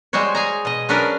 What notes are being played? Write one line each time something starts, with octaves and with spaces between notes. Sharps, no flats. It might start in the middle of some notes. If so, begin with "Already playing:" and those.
G3 G#3 F#4 C5 C#5
G#4 G#5 A#5
B2 D#5
F#3 C#4 D4 F#4 A#4 B4